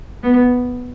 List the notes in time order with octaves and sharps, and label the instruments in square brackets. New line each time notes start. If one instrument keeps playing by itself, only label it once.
[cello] B3